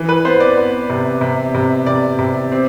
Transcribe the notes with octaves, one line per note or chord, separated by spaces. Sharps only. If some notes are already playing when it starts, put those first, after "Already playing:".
Already playing: E3
B4
B3 C5
D5
B3
C3
C3
C3
C3 D5
C3
C4